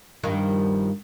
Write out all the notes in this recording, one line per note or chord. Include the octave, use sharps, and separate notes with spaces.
G2 D#3 F3